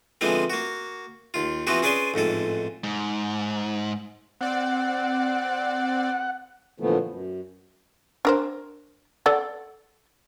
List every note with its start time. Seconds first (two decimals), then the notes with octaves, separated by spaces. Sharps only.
0.21 D3 E3 F3 G#3 B3 C4
0.50 A#3 F#4
1.34 D#2 F4
1.67 E3 F3 B3 C4 F#4 G4
1.82 C#4 G#4 B4 D5 G#5 C6
2.14 A1 F2 G#2 A4
2.84 G#2
4.41 C4 D5 F#5
6.80 A#2 D3 E3 F3 A3 B3
7.09 F#2
8.25 D4 A#4 C5
9.26 A4 D5 F#5